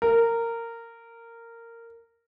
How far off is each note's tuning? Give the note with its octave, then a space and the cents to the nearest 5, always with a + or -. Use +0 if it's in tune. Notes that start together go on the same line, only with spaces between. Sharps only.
A#4 -15